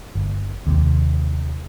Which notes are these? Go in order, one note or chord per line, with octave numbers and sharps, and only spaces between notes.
G1
D#2 C3